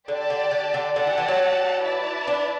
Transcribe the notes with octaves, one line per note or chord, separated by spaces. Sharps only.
D3 G4 D5 A5
D3
D3
D3
D3 G4 D5 F#5 A5
E3
E3
F#3
E4 B4 D5 A5
D4